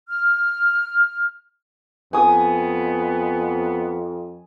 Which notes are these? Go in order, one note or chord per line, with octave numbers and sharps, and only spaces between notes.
F6
F2 B3 G#5 D#6